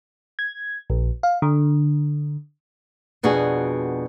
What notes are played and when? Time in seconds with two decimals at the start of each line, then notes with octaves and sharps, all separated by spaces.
0.39 G#6
0.90 A#1
1.23 F5
1.42 D3
3.23 F2 B2 D4 F#4 G#4